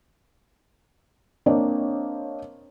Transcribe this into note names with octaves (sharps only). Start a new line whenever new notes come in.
A#3 C4 D4 C#5 D#5